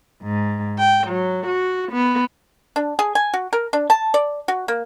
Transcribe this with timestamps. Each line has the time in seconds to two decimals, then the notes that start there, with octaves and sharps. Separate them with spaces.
0.22 G#2
0.78 G5
1.07 F#3
1.48 F#4
1.91 B3
2.76 D4
2.99 G#4
3.15 G#5
3.34 F#4
3.53 A#4
3.73 D4
3.90 A5
4.14 D5
4.48 F#4
4.68 A#3